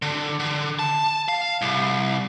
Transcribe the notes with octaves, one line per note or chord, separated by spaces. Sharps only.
D3
D3
A5
F5
C2